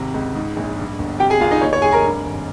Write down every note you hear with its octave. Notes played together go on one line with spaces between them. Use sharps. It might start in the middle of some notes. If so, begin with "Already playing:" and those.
Already playing: G#1 C3
C#2
G#2
A#1
G2
G1
C3 G4 G5
G#4 G#5
C2 F4 F5
D#4 D#5
D#2 C#5
C#5
F1 G#4 G#5
A#4 A#5
G2
G#1